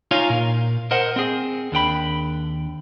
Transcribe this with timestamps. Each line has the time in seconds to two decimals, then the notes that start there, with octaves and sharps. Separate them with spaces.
0.11 D#4 F4 C#5 F5 G#5 A#5
0.29 A#2
0.91 A#4 C5 D#5 F#5
1.16 C4 G#4
1.72 D#2 D4 G5 B5